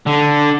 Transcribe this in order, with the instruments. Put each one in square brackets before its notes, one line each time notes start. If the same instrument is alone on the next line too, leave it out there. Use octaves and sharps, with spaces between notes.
[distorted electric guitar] D3